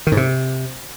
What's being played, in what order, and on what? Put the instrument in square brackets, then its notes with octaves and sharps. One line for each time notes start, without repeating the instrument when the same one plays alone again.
[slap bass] D#3
G#2
C3